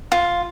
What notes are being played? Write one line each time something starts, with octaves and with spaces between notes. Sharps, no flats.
F4